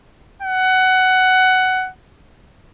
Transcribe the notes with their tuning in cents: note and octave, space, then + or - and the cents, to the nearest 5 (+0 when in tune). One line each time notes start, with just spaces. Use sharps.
F#5 +15